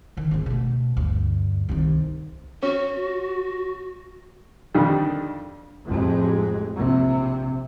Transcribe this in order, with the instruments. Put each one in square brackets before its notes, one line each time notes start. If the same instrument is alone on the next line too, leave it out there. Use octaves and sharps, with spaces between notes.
[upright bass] D3 D#3
G#1 C#2
B2 A3
D2 G2
C2 D#3
[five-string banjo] C#4 [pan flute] F#4
[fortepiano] F2 D3 D#3 G3
[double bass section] A1 F2 G#3
A#1 C3